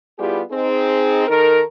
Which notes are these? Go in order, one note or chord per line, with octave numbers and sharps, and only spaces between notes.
G3 B3 E4 F4 G4 G#4
C4 D#4 G#4
D#3 D#4 A4 A#4